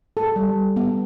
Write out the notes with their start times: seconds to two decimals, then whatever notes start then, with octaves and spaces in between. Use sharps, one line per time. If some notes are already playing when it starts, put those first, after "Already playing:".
0.17 A4
0.36 G3
0.76 B3